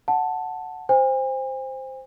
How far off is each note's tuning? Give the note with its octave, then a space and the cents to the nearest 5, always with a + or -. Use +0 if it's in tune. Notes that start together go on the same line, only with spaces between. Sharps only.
F#5 +0 A5 +0
C5 +0 G#5 -45